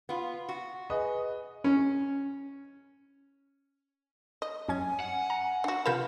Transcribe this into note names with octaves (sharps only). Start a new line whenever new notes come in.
B3 F4
F#4
G#4 B4 D#5
C#4
D#5
F#2 C#4 G#5 G#6
F#5
A#5
D4 F#4
C3 F4 A#4 B4 G6 E7